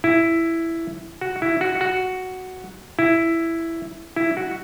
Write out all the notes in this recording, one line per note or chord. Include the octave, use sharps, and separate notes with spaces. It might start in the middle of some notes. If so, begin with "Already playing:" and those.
E4
F#4
E4
F#4
F#4
E4
E4
F#4